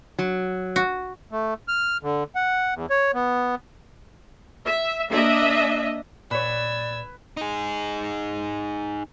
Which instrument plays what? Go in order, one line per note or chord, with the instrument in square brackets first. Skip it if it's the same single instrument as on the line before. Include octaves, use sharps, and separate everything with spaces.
[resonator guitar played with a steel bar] F#3
[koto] F#4
[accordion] A3
F6
D3
F#5
E2
C#5
B3
[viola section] E5
A#3 D4 D#5 E5
[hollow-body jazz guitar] A#2 C#5 [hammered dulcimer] B4 [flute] D5 [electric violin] E6 G#6
[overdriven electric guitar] D#4 G#4